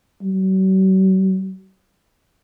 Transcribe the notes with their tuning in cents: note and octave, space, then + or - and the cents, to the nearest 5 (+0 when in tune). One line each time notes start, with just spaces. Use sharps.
F#3 +45